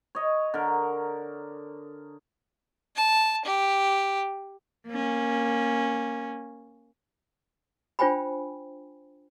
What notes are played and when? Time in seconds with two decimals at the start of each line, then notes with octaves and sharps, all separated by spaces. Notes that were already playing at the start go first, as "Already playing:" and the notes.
0.15 C#5 D#5
0.54 D3 A#4
2.96 A5
3.45 G4
4.88 A#3 C#4
7.99 D4 F4 C5 G5 G#5 B5